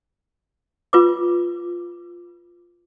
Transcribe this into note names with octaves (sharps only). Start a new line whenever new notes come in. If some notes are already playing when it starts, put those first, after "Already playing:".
F4 B4 D6